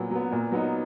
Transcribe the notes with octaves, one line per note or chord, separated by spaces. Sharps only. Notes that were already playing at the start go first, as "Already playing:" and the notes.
Already playing: A#2 F#3 B3
F#3 B3
A#2
F#3 B3 D#4